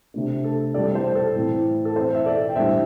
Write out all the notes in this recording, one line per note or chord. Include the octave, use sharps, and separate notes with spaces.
C3 A3 D4
A4
E3 G3 C4 E4 A4 D5
C5
A4
A2 E3 C4 E4
A4
E3 C4 E4 C5
E5
A4 D5
G5
A2 E3 G3 D4 C5 E5